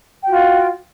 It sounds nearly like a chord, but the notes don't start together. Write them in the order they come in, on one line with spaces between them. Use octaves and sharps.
G5 F#4 F4